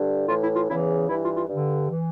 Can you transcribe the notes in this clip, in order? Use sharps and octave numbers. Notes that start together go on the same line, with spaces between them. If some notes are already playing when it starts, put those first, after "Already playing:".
Already playing: G2 D3
A2 E3 F4
E4
F4
E2 C#3 E3 E4
G2 E3 E4
F4
F4
G2 D3
E3